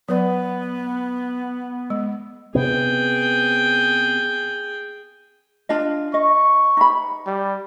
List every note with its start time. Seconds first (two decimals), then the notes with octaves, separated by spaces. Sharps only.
0.09 F#3 B3 B4 D5
1.90 G#3
2.55 C3 B3 G#4 G5
5.69 D4 F4 D#5
6.14 D#5 C#6
6.77 D#4 B5
7.26 G3